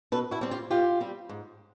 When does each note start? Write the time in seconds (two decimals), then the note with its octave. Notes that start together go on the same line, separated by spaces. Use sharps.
0.12 B2 A4 B4
0.31 E4 F#4
0.41 G3 C4
0.51 F4 G4
0.71 B2 F4 G4
1.00 G3 C4
1.29 G#2